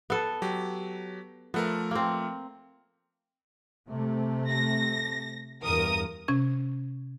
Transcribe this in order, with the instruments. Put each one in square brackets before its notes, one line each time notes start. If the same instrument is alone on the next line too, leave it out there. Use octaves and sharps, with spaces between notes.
[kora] B3 A4
[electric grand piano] F#3 G4
[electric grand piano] F3 A3 A#4 [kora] B3
[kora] A#3 C4
[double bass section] C3 A3
[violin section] A#6
[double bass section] E2 G2 [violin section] A#4 D#6
[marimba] C3 C#4 G#6